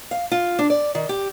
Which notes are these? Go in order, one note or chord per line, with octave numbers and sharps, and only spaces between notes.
F5
F4
D4
D5
D#3
G4